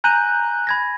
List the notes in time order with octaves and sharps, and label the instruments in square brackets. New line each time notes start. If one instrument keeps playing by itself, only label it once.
[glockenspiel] G#5 D#7 [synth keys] A#5 F#6 G6
[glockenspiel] B5 G#6 A#6